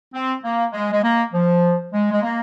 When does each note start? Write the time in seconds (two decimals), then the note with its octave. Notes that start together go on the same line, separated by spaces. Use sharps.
0.13 C4
0.44 A#3
0.73 G#3
0.92 G#3
1.03 A#3
1.33 F3
1.92 G#3
2.11 G#3
2.22 A#3